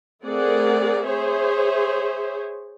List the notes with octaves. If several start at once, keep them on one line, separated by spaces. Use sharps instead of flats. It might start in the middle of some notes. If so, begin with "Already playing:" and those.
A3 C4 G#4 A#4 D5 F#5
G#4 C5 C#5 E5